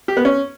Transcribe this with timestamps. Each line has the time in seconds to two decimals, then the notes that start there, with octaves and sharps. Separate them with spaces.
0.08 G4
0.17 B3
0.25 C#4